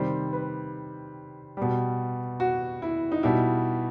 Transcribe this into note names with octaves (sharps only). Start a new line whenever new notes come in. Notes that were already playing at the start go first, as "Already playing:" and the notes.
Already playing: C3 D#3 G3 C5
B4
B2 G3
F#4
E4
D#4
B2 G3 E4